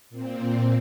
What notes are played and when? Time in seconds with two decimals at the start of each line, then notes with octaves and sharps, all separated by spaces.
0.10 A#2 C4